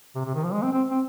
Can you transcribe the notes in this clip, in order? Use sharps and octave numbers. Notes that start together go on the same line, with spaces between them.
C3
C3
D#3
F3
G#3
C4
C4
C4